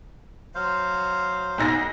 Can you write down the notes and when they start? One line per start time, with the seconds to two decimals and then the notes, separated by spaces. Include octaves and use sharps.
0.55 F#3 C5 F5
1.58 B1 D#4 A#6